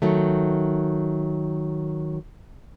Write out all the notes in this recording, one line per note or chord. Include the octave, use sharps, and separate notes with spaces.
D#3 F#3 A3